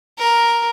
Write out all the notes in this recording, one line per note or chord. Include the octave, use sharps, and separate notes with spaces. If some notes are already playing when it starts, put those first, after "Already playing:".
A#4